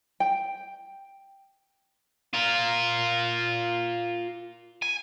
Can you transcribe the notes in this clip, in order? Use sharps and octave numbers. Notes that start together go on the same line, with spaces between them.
G5
F4 A#4
G#5